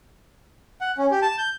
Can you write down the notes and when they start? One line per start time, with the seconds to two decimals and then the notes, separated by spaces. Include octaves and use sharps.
0.81 F#5
0.98 C#4
1.11 G4
1.22 A5
1.38 G6